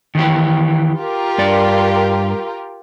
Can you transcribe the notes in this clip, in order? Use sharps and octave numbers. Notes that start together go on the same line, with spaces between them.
D#3 E3 G4
F4 G4 A#4
G2 D5